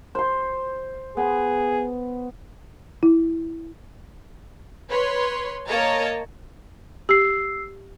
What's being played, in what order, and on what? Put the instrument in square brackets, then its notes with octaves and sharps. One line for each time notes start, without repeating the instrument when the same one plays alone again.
[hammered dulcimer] C5 C6
[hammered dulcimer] B3 [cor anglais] G#4
[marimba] E4
[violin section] B4 C#5 B5 C6
A#3 A#4 C#5 D#5 A5 A#5
[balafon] G4 [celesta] E6 C7